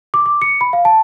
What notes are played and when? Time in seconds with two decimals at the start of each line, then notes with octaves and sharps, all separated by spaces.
0.14 D6
0.26 D6
0.42 C#7
0.61 B5
0.73 F5
0.85 A5